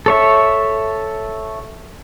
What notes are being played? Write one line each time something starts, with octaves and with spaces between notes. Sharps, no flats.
A4 C#5 E5